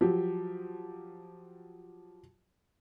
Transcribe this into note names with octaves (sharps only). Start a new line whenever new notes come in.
F3 F#3 G4